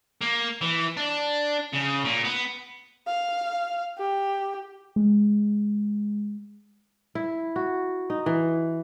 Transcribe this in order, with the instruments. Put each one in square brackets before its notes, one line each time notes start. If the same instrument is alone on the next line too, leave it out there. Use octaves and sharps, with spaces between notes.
[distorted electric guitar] A#3
E3
D4
C#3
A#2
B3
[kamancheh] F5
G4
[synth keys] G#3
[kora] E4
F#4
D#4
E3